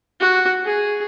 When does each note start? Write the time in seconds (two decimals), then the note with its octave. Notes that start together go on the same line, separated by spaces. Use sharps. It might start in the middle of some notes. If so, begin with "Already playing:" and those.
0.20 F#4
0.65 G#4